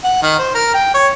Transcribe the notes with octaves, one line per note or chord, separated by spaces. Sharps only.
F#5
D#3
C5
A#4
G5
C#5